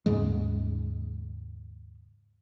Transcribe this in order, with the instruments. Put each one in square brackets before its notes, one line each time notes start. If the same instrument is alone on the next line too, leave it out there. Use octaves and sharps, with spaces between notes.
[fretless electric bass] D#2 G#2 C#3 G#3